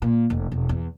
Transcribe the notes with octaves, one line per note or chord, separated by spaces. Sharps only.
A#2
F1
E1
E2